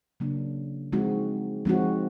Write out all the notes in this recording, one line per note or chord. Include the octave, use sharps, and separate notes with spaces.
C#3 F#3 A#3 D4
F3 G#3 C4 D#4 F#4
F3 G#3 C4 D#4 F#4